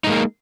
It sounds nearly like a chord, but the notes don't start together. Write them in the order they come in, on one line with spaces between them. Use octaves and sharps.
D#4 G#3 A#3